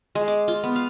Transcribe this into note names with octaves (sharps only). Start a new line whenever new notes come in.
G#3
D6
F4
B3
F5